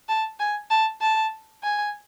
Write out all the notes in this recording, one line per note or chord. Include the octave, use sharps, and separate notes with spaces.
A5
G#5
A5
A5
G#5